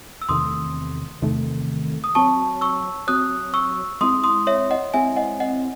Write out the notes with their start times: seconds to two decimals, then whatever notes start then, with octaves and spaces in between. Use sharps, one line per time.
0.22 E6
0.29 E2 C3 D#3 A3 C6 D#6
1.22 E2 C3 D#3 A3
2.04 D#6
2.15 F#3 C4 F#4 C#5 A5 C#6
2.61 C#6 E6
3.07 F#3 C4 F#4 C#5 D#6 F#6
3.54 C#6 E6
4.01 G#3 C4 E4 C6 D#6
4.24 C6 D#6
4.47 C#5 E5
4.71 D#5 F#5
4.94 G#3 C4 E4 E5 G#5
5.16 D#5 F#5
5.40 D#5 F#5